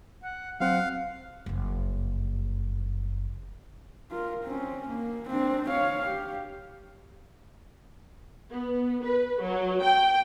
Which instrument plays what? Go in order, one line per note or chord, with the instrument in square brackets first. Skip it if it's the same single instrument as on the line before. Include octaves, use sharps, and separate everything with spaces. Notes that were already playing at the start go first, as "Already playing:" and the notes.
[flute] F#5
[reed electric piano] F#3 C4 [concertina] F5 [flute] F#5
[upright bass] F#1 F2
[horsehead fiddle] F4 A#4
C4 C#4
A#3
C4 D4
C#5 F5
G4
[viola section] B3
B4
F#3
G5